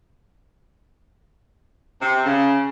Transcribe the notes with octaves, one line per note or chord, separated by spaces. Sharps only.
C3
C#3